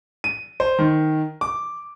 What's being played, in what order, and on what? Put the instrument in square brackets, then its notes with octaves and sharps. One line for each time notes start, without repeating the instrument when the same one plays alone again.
[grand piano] D#7
C5
D#3
D6